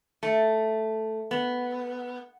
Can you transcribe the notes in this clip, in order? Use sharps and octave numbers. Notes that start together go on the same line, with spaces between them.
A3
B3